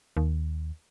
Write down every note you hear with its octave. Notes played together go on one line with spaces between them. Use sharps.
D#2